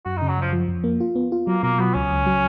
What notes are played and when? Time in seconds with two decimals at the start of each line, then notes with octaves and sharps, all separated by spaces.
0.05 F#2 F#4
0.17 C#3 D#4
0.29 F#3
0.37 F#2 F3
0.53 F3
0.68 F2
0.84 A#3
1.00 F4
1.16 B3
1.32 F4
1.47 F#3 A#3
1.63 B2 A#3
1.79 F#3 B3
1.94 C#2 C#4
2.11 C#2
2.26 F#3